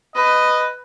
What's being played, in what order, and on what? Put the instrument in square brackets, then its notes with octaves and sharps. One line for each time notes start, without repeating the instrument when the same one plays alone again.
[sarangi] B4 [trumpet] D#5